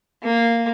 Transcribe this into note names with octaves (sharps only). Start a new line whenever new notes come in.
A#3